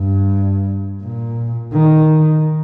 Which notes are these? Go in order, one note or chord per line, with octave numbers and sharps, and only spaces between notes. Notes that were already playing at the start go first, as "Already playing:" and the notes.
Already playing: G2
A#2
D#3